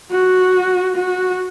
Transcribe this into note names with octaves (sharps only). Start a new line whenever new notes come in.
F#4
F#4